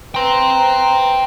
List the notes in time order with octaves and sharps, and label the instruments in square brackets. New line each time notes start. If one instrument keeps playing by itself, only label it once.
[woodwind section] B4 A#5 [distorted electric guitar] G5 C6